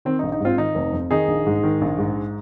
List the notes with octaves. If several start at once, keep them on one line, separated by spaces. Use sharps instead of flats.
D#3 C4
A#1 D#4
D#4
G#2 C4 F4
D#3 D#4
F1
F2
D#3 D#4 G#4
A#1
G#2
D#3
A#1
G#2